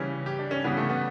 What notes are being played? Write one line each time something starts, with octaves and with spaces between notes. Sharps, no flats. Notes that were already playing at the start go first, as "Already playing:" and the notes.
Already playing: C#3 E3 G3 C#4
G4
D4
C#4
C#3 E3 G3 B3
A3
B3